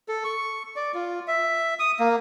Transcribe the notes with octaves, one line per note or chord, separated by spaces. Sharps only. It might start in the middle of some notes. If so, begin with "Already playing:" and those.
A4
C#6
D5
F4
E5
D#6
A#3